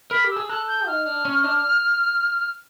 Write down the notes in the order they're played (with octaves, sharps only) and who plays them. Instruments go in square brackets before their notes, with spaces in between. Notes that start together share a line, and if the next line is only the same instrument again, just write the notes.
[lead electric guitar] A#4 [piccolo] B5
[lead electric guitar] G4
[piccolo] E6
[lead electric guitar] G#4
[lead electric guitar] A4 [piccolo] F#6
[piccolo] G6
[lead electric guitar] D#4 [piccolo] F6
[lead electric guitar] D4
C#4
D4